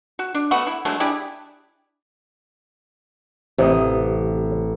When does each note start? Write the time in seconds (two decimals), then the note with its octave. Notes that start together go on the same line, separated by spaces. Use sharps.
0.19 F#4
0.35 D4
0.51 A3 B3 F#4 F#5
0.67 E4
0.85 F#3 G#3 A3 D4
1.00 D4 E4 G4 G#4
3.58 A1 C3 D#6